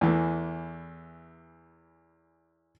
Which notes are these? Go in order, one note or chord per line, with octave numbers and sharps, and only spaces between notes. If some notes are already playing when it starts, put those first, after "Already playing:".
E2 E3 A3